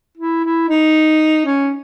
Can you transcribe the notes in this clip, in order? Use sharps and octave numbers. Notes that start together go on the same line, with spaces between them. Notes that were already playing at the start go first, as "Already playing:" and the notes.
E4
E4
D#4
C#4